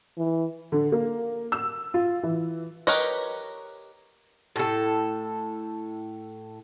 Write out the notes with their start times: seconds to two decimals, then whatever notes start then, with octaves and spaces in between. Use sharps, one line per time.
0.18 E3
0.72 D3
0.92 A#3
1.52 E6
1.94 F4
2.23 E3
2.87 G4 A#4 B4 C#5 D#5
4.56 A2 A4